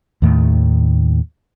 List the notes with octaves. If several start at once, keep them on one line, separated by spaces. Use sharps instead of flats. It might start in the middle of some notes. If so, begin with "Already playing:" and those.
D#2 A2 D#3 A3